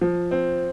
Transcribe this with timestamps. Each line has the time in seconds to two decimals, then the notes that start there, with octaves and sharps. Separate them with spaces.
0.01 F3
0.31 C4